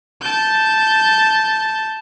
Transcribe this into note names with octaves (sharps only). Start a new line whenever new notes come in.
A5 G6